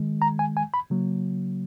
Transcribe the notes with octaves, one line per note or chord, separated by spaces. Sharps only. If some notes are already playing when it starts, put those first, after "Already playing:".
Already playing: D#3 G#3
A#5
G#5
G#5
B5
C#3 F#3 A#3